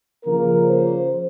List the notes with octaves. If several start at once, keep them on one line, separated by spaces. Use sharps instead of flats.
C#3 F3 A#3 A#4
C5